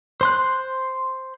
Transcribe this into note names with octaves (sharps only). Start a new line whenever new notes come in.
C5 C6 F#6